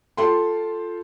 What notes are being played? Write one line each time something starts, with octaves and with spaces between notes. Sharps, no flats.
F4 A4 G5 C6